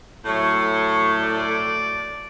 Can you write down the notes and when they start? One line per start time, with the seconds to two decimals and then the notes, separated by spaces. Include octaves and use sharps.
0.24 A2 F#3 A3 C#5
1.21 D5